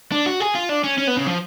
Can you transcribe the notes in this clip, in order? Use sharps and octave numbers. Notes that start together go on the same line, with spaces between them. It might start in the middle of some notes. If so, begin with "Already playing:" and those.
D4
F#4
G#4
F4
D4
C#4
C#4
B3
C#3
F3